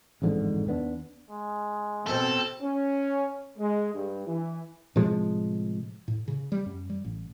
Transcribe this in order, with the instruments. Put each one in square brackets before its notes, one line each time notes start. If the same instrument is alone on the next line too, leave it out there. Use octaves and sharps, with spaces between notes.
[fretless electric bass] A1 F2 G#2 D3
D#2 B3 D4
[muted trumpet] G#3
[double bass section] B2 C4 [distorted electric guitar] A4
[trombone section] C#4
G#3
G2
E3
[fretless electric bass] A2 C3 F3 G#3
A2
C#3
G3
F#2
G3
A1